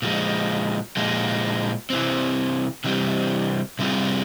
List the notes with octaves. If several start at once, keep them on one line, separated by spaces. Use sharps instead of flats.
A#2 F3 G#3
A#2 F3 G#3
C3 E3 G3 C4
C3 E3 G3 C4
C3 G3 C4 F4 G#4